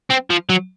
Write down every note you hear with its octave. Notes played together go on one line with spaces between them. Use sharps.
C4
F3
F#3